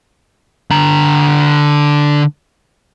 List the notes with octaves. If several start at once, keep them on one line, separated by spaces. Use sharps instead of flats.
D3 A#5